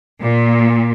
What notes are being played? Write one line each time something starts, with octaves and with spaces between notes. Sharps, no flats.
A#2